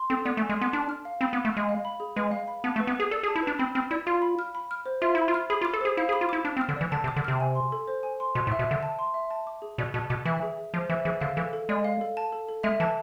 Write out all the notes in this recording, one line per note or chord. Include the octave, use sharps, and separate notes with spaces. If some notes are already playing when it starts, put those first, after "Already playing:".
Already playing: C6
C4 A4
B3 D5
A3
G#5
G#3
B3 C6
D4 D6
F6
F5
C4 B5
B3
D6
A3
G#3 F6
F5
B5
G#4
G#3 B4
F5
B5
B3 A5
A3
B4
B3
G#4 B4
A4 D5
G#4
A5
E4
D4 B4
C4 B5
C4 F6
E4 D5
F4 F5
B5
F6
B5
F6
C5
F4 E5
E4 B5
F4
F6
G#4 B5
F4
D6
A4
G#4 C5
E4 F5
G#4
B5
F4
E4 D6
D4 D6
C4
F6
D3
E3 D5
D3 A5
C3
D6
D3
C3 F6
G#5
C6
A4
C5
G#5
C6
B2 C6
A2
E5
B2
D3 E5
A5
C6
E5
A5
D6
G#4
B2 D5
B2 A5
B2 D6
E3 E5
G#4
G#4
F3 C5
E3 E5
E3 G#4
D3 F5
E3 A4
A4
G#3 D5
F5
A4
A5
A4
A4
G#3 E5
E3 A5